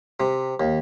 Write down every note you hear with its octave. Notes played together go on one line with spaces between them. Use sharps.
C3
D#2